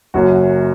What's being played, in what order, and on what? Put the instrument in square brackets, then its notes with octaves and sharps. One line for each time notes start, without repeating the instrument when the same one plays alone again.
[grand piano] F#1 F#2 F#3 F#4